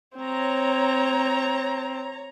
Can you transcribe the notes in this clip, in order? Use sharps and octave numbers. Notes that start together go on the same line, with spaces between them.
C4 C#5 A#5